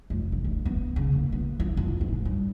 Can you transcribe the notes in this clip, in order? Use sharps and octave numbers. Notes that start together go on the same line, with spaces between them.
F1
E2
D3
B3
C#3
D#2
B3
E4
F2
G#2
G#3
G2